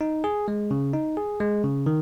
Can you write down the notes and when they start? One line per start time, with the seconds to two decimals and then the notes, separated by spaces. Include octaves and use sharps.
0.01 D#4
0.24 G#4
0.48 G#3
0.71 C#3
0.93 D#4
1.17 G#4
1.40 G#3
1.63 C#3
1.86 D#3